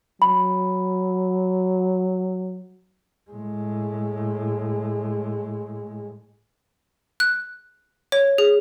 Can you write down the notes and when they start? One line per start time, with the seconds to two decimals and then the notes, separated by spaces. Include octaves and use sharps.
0.22 F#3 B5
3.30 A2 G#3
7.20 F#6
8.12 C#5
8.38 G#4